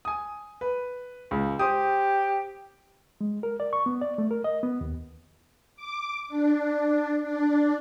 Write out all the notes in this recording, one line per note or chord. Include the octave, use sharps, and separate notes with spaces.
G#5 D#6
B4
C#2
G4 C5 D#6
G#3
A#4
D5
C#6
B3
D5
A3
A#4
D#5
B3
D#2
D6
D4
D4